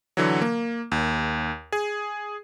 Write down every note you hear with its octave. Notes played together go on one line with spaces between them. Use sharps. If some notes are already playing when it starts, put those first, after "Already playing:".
D3 E3 F#3
A#3
D#2
G#4